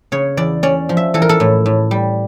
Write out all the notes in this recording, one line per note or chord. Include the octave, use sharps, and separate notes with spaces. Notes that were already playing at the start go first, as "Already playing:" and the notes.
C#3 C#5
E2 D5
C#4 D5
F3
E5
E3 A4
A#4
A4
A2
A2
G3